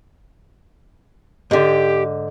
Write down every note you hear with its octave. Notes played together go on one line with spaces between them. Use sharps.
G#2 D3 G4